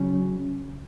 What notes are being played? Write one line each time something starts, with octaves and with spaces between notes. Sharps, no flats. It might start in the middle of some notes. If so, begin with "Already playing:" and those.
Already playing: C#3 F#3 C#4